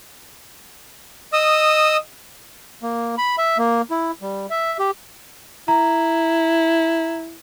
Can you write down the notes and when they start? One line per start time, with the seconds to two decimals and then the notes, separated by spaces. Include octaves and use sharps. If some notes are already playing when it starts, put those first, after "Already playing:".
1.33 D#5 D#6 E6
2.83 A#3
3.18 B5
3.38 E5
3.58 A#3
3.91 E4
4.22 G3
4.50 E5
4.79 G4
5.68 E4 A#5